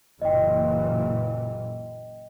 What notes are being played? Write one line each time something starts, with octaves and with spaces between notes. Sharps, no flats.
F#1 A#2 E3 D#5 G5